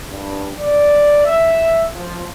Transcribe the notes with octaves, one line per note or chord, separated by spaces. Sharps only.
G2
D5
E5
F3